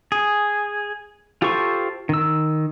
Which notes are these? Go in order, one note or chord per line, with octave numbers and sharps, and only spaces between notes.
G#4
F4 G4 A4 C5 C#6
D#3 E6